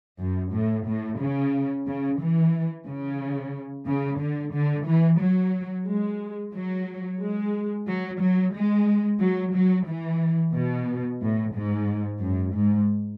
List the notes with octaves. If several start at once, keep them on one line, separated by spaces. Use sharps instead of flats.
F#2
A2
A2
C#3
C#3
E3
C#3
C#3
D3
D3
E3
F#3
G#3
F#3
G#3
F#3
F#3
G#3
F#3
F#3
E3
B2
A2
G#2
F#2
G#2